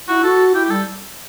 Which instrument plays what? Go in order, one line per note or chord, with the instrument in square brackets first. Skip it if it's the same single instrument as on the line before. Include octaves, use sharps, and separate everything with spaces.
[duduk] E4 [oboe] F#4
[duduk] F#4 [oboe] A4
[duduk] E4 [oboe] G4
[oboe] G4
[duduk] G3 [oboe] A4